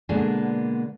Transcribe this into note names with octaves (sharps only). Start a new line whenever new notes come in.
B2 D3 G#3 A#3 B3 D4